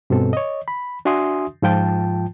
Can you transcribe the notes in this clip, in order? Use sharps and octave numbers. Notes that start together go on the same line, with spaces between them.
G2 B2 C4 A4
C#5 D#5
B5
D4 F#4 E5 G#5 C6 D#6
G#2 F3 F4 G5 A5